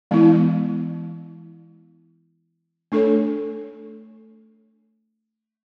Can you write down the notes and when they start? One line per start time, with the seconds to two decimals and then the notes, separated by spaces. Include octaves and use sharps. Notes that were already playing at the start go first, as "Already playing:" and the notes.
0.11 E3 G#3 B3 E4
2.92 A3 D4 A4 C#5